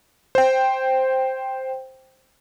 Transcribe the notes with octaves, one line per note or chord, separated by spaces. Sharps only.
C5 G5